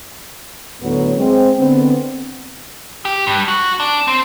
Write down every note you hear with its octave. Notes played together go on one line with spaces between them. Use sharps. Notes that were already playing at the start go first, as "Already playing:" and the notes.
D2 A2 F#3 B3
G#3 C4
D3 B3 C4
G4
G2
F#4
D4
C4